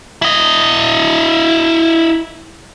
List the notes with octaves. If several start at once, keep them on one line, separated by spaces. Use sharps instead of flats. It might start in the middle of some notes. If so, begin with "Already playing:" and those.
E4 D#5